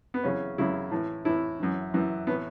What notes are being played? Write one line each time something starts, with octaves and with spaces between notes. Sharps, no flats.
B3
F#2 C#3 E3 C#4
F#2 C#3 E3 E4
A2 E3
A2 E3 E4
F#2 E3
F#2 E3
A2 E3 B3